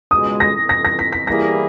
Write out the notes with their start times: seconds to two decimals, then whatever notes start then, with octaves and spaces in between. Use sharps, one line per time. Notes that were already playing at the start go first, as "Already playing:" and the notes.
0.11 C#2 B2 G#3 D#6
0.40 A#6
0.69 A#6
0.85 A#6
0.99 B6
1.12 B6
1.27 E3 G3 A#3 E4 G#4 A#6